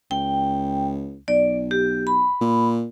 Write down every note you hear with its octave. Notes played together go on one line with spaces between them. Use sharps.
C#2 G5
B1 D5
G4
B5
A#2